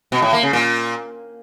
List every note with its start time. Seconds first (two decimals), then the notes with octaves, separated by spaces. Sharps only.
0.12 B2
0.22 A2
0.33 A#3
0.43 C#3
0.53 A#2